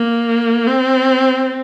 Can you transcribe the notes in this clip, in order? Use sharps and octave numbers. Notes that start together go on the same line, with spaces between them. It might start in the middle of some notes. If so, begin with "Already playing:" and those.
Already playing: A#3
C4